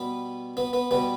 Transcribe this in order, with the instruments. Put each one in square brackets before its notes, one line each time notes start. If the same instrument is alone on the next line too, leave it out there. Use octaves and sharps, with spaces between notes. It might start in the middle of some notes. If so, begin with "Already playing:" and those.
Already playing: [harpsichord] B2 G3 B3 B4
B3 B4
B3 B4
B2 G3 B3 B4